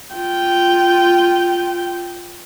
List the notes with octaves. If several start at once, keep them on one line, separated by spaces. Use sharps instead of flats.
F4 G5